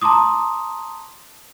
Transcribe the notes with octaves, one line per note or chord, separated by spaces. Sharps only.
A5 A#5 C6 D6 D#6